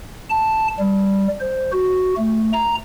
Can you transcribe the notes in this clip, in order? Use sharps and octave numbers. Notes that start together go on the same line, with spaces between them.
A5
G3
C5
F#4
A3
A#5